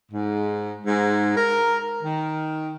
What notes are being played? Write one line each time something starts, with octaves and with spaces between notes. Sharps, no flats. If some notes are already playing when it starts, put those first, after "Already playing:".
G#2
G#2
A#4
D#3